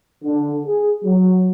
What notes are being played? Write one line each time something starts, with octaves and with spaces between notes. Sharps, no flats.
D3
G#4
F#3